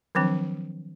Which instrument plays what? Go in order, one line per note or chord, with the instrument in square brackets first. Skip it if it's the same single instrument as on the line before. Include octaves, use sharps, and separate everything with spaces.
[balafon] D#3 F3 F#3 C4 D4